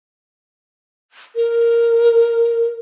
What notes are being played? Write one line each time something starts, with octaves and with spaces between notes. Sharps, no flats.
A#4